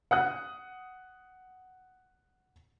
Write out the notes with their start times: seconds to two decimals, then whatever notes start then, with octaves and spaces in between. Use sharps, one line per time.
0.11 F#5 D#6 F#6